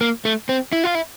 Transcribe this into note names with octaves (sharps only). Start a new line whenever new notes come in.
A#3
A3
C4
E4
F4
E4